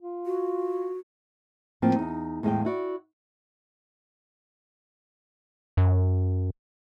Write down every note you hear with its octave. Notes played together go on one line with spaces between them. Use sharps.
F4
F#4
A2 F3 A#3 C4 G5 A5
E2 D#4
E2 A2 G#3 E5 F5 G5
E4 F#4 D5
F#2